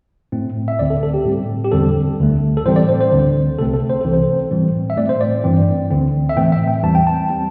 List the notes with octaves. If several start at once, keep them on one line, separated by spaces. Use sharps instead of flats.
A2 A3 C4
E5
D2 D3 C4 D5
A4
A4
G4
A2 G3 C4
G4
E2 D3 G3 C4 A4
D2 D3 A3
A4
A2 E3 G3 C4 C5
D5
C5
C5
D2 D3 C4
C2 C3 A3 C4 A4
A4
C5
C2 C3 E3 C4 A4
C5
A2 E3 G3 C4
E5
A2 A3 C4 D5
C5
D5
G2 E3 C4
D2 D3 C4
E5
A2 E3 A3 C4 G5
E5
G5
E2 E3 G3 C4 A5
G5
A5
G3 C4